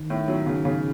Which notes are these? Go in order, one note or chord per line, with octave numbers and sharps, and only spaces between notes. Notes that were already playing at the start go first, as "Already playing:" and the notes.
Already playing: D#3
A2
F#3
C#3
C#3